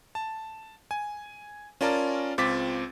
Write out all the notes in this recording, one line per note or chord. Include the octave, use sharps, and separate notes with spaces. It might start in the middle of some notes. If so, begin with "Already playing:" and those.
A5
G#5
C#4 F4 A#4 D5 A5 A#5
C#2 C4 F4 D6 A6 B6